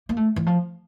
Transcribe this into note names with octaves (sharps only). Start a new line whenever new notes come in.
A#3
A3
E3
F3